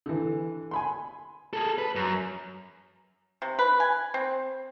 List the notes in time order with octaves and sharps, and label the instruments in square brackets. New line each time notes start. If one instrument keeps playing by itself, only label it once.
[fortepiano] D3 E3
G#5 B5 C6
[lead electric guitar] G#4 A4
B4
F#2
[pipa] C3
B4
G#5
C4